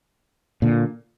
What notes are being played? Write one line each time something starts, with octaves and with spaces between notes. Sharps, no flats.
A#2 D3